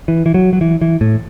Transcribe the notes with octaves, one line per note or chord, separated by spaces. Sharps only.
E3
E3
F#3
F#3
E3
E3
A2